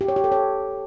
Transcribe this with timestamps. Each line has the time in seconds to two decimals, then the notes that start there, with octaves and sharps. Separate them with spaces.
0.01 G4
0.08 C#5
0.16 G4
0.24 A4
0.32 C#5